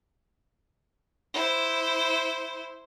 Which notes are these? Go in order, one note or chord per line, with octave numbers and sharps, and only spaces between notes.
E4 C5